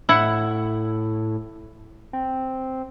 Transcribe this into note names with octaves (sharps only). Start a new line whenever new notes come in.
A2 E4 F#5
C4